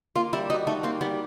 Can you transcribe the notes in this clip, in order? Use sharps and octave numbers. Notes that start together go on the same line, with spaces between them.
A#3 F4
G3 E4
D#4 F#4
A3 D#4
A#3 C4
G3 B3